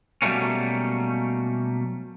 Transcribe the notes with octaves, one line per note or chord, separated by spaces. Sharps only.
B2 F#3 G3 A3 A#3 C#4